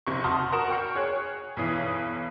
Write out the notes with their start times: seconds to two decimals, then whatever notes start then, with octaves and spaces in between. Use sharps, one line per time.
0.07 F#1 C3 C#6
0.24 F#4 A5 C6 D#6 F6
0.52 F#4 A#4 C#6 E7
0.70 G5 C#6 F6 C#7
0.95 G#4 C#5 F#6
1.57 B1 E2 E3 D#6 C7